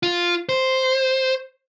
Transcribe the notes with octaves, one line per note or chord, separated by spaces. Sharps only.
F4
C5